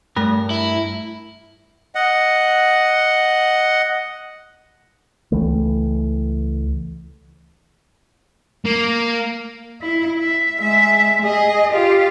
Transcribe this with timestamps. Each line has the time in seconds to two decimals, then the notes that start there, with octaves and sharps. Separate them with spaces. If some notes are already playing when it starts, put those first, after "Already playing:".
0.16 G2 A3 A#4
0.50 E4
1.95 D#5 F#5
5.32 C#2 E3 A3
8.66 A#3
9.82 E4
10.20 E5
10.60 G#3 E5
11.22 G#4 D#5
11.70 F4 G4